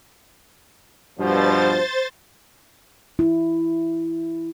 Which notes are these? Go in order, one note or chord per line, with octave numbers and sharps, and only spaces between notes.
G2 B2 F3 C5 A6
E4